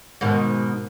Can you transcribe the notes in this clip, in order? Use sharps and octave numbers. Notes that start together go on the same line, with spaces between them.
G#2 B2 D#3